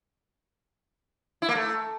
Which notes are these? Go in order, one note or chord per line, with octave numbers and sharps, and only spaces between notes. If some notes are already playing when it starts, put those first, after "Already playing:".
E4
A#3
A3